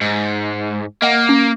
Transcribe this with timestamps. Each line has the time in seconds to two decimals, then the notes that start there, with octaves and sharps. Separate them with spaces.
0.01 G#2
1.02 A#3 D#5 F#5
1.29 C#4